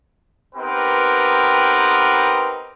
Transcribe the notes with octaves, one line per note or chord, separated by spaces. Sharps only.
B3 C4 D#4 G4 A#4 B4